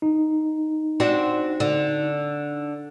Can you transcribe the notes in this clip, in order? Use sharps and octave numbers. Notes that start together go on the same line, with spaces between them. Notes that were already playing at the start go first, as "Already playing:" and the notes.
D#4
C4 D4 F#4
D3